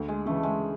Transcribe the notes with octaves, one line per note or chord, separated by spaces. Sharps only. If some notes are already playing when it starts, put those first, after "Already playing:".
Already playing: D2
G#3
C#3 E3 A3
G#3